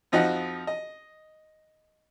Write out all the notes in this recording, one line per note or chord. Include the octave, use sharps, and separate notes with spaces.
F2 F3 D#4 F#4 D#5 F#5
D#5